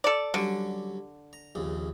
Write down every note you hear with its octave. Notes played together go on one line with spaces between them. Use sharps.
A4 D5
D3 F#3 G3 C#4
A#5
A#1 D#2 C#3